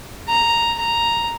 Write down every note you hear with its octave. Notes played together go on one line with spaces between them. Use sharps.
A#5
A#5